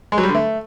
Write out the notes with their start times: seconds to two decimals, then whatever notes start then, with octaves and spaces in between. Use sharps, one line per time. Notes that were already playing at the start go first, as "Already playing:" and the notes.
0.12 G#3
0.18 F#3
0.23 G3
0.29 D3
0.35 A3